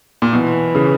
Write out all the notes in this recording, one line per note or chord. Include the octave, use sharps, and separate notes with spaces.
A#2
B2 E3
C#3